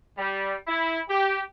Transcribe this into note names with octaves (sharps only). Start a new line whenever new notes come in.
G3
E4
G4